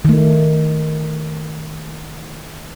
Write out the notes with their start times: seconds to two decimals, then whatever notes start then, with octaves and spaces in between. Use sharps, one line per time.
0.05 D#3 A3